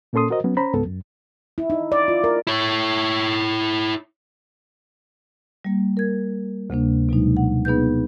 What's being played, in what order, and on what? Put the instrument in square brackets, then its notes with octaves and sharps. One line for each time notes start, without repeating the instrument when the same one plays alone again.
[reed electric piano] A#2 A#3 C#4 A4 C6 D#6
F#4 A#4 C5 D#5
F#3 B3 C#4
C#4 C5 A#5 B5
C#2 G#2 B3 A4
F#2
[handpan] E4
D#4
D5
F4
A#4
[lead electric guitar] E4 C#5
[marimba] G3 A#3
A#4 G#6
D2 C3 A#3 D4
B2 F#3 G#3 D#4
F#5
B3 D#4 G#4 B4 G6